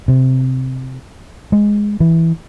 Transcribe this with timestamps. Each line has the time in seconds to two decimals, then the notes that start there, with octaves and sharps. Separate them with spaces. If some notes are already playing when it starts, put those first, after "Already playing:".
0.08 C3
1.52 G#3
2.00 E3